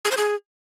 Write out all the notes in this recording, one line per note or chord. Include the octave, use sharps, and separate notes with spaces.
G#4
C5
G#4